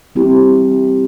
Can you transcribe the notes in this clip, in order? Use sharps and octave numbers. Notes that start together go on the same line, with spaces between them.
G3 C4 E4 G4